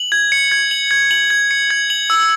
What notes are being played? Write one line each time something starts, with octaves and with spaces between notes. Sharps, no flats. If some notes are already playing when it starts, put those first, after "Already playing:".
Already playing: F#7
G#6
C#7
G#6
F#7
G#6
F#7
G#6
C#7
G#6
F#7
E6